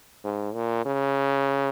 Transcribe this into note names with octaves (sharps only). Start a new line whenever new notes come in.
G#2
A#2
C#3